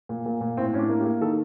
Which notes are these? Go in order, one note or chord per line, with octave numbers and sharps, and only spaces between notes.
A#2
A#2
A#2
A2 C4
A2 C#4
D4
A#3
G4
A#3
D#3 A4